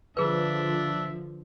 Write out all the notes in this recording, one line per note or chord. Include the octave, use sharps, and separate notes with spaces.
D3 F3 D4 F4 G#4 B4 E5